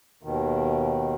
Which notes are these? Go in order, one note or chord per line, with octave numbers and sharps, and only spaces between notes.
D#2 B2 D#3